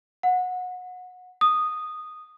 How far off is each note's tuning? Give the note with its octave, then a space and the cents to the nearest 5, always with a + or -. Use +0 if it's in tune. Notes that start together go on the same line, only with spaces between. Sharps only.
F#5 -25
D#6 -10